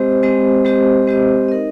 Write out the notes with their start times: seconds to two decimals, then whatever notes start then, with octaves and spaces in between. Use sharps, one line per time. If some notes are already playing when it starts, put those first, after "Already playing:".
Already playing: G#3 C4 G4 C5 D#5
0.23 G#3 C4 G4 C5 D#5
0.65 G#3 C4 G4 C5 D#5
1.07 G#3 C4 G4 C5 D#5
1.48 D#4 A#4 D#5